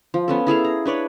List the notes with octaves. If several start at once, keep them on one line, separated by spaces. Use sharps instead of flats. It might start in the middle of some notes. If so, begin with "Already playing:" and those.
F3
B3 C#4 A4
E4 G#4 A4 F5
A#5
D4 B4 C#5 D5